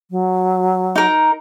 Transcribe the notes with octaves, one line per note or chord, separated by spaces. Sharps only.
F#3
D#4 A#4